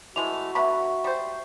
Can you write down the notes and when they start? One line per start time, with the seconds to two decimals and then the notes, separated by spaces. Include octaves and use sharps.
0.16 E3 G#3 A3 F#4 F7
0.55 D3 B3 E5 A#5 B5 C#6
1.04 G3 C5